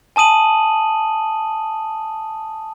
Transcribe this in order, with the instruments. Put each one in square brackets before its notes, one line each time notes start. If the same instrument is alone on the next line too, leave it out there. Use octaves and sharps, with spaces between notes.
[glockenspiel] G#5 A5 D#6 D#7 F#7